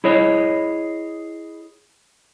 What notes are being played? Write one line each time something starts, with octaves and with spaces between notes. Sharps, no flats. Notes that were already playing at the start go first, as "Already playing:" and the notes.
E4 G#4 C#5 D#5